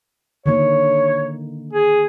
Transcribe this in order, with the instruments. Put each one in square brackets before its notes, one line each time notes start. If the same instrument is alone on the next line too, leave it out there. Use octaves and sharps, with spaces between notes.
[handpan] D3 D#3 A#3 [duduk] C#5
[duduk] G#4